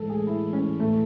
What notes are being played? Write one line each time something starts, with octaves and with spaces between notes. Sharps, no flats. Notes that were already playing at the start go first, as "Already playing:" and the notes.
Already playing: A2 E3 G#3 A4
G#4
E4
C#4
A3